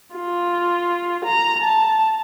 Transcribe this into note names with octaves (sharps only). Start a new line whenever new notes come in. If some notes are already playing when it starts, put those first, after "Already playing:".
F4
A#5
A5